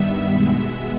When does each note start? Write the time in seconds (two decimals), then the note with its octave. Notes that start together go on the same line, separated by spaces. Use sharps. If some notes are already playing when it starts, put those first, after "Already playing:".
Already playing: G2 D#3 G3 B3 E5
0.30 B2 G#3 B3 E5